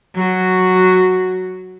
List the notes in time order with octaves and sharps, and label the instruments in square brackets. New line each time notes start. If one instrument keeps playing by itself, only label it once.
[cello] F#3 F#4